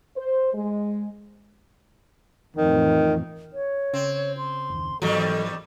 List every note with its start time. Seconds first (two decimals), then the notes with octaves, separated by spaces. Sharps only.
0.16 C5
0.54 G#3
2.56 F2 A2 D#3 E3
3.53 C#5
3.94 C#3 C4
4.37 C6
4.70 F#1 D#2
5.02 E2 G#2 D#3 E3 F#3 G3 A4